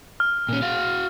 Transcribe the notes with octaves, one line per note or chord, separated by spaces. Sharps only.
F6
A#2 C#4
F#4 F5